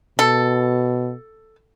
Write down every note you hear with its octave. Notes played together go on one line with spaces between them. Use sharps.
B2 A4